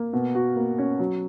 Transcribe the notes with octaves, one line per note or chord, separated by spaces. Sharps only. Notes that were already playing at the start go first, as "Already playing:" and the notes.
Already playing: A#3
B2
F#4
A#3
C#4
F#3